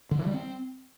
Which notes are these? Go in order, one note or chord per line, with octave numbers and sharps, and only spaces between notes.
D3
E3
G3
C4